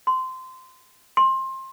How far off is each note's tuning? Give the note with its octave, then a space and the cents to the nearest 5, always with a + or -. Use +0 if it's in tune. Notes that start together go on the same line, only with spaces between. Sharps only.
C6 -20
C6 +20